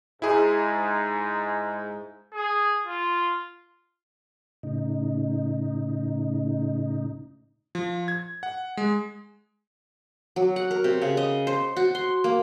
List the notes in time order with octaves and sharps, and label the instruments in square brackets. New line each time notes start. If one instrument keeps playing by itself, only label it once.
[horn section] G#2 [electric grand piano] E4 G#4
[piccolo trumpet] G#4
F4
[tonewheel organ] A2 C#3 D#4
[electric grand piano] F3
G#6
F#5
G#3
[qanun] F#3
F#5
A#4
C3
C#3
D#5
C5
F#4
C6
A#3